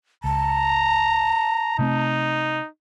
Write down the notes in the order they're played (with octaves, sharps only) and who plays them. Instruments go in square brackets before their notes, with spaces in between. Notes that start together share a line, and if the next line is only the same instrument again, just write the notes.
[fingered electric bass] C#2 [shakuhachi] A5 [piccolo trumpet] A#5
[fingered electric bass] C3 A3 C4 [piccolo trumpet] D#4